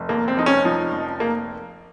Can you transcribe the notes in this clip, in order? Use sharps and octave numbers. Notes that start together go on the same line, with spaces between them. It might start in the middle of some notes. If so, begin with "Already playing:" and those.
Already playing: F1
D#2 A#3
C4
F1 D#4
C#4
F3 D#4
F1
A#3